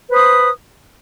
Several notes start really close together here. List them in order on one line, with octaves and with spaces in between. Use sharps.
B4 C5 D#6